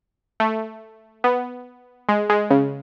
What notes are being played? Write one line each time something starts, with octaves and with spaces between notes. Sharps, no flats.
A3
B3
G#3
G#3
C#3